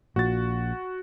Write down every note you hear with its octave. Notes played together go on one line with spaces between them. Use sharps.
A#1 A#2 F#4 A6